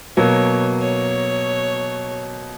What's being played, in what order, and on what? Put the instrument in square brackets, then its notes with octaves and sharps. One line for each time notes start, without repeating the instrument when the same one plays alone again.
[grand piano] B2 F#3 A#3 [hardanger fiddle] C#5
[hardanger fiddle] C#5